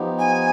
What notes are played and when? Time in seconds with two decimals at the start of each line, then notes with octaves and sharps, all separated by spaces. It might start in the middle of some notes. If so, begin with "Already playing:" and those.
Already playing: F3 B3 D#4 G4
0.19 G#5